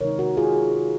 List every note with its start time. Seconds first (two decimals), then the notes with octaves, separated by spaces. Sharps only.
0.01 C3 D#3 G#3 D#4 A#4 C#5
0.19 F#4 A#4
0.37 F4 G#4